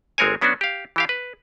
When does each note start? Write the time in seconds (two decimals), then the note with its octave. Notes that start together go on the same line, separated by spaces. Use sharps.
0.18 G1 G#3 C4 A#4 C#5 G#5
0.41 F#3 B3 C#4 D4 F#4
0.61 G4 F5
0.96 E3 G4 F5
1.09 B4